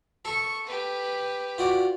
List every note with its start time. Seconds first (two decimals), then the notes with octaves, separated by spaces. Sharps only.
0.25 A4 C#6
0.66 G4 B4
1.58 F4 F#4 D5